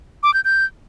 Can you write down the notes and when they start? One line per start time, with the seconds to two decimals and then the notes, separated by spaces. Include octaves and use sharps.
0.23 D6
0.34 G6
0.45 G6